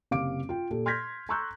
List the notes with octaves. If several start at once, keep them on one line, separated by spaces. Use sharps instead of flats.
F#1 C3 F5 D6 D7
F4 G5
A#2 G4 A4
C6 F6 G6 G#6 A#6 B6
A#5 C6 C#6 E6 F#6 G6